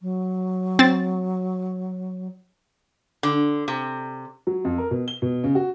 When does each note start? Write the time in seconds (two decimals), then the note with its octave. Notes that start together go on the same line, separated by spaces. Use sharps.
0.01 F#3
0.79 C4 A6
3.23 D3
3.68 C3
4.47 F#3
4.65 F2
4.78 A#4
4.91 B2
5.08 G7
5.22 B2
5.44 C#3
5.55 F#4